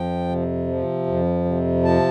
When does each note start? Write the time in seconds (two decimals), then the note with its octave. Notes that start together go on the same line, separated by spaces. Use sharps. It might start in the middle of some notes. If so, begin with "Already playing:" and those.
Already playing: F2 F3 G5
0.29 C3
0.67 F3
1.06 F2
1.45 C3
1.83 F3 A5